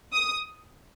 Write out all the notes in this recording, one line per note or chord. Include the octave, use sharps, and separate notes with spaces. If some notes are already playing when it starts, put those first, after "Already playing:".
D#6